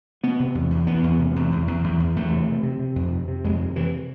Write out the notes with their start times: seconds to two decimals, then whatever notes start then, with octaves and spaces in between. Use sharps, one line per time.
0.23 C3 B3
0.40 C3
0.55 E2
0.70 E2
0.87 E2 B3
1.03 E2
1.19 C3
1.36 E2
1.52 E2
1.67 E2
1.84 E2
2.00 E2
2.16 E2 A3
2.32 C3
2.48 C3
2.63 C3
2.79 C3
2.96 F2
3.12 C3
3.28 C3
3.44 F2 G#3
3.60 C3
3.76 C3 E3